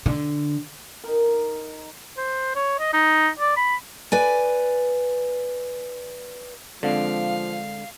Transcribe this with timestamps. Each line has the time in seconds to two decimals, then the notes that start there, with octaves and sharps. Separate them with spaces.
0.06 D3
1.04 D#4 A#4
2.17 C5
2.56 C#5
2.80 D#5
2.93 D#4
3.39 D5
3.56 B5
4.12 B4 D5 G#5
6.83 D3 F3 G#3 C4 D4 F5